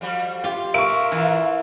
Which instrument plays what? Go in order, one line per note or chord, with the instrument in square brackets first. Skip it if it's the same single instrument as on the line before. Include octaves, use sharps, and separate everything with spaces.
[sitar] F2 G3 F#4
[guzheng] F4 [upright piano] G4
[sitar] F3 [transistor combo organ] A#4 E5 F5 [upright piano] C#6 D7
[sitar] A#2 F4 [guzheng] E3